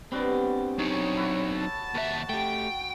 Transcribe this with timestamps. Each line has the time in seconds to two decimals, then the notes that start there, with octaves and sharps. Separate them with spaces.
0.12 G3 B3 C4 D4 F#4
0.79 F#3 D#4 G#4 C#5
1.17 E4 F#4
1.53 A5
1.95 D#2 F#4 E5
2.29 A3 G4 G5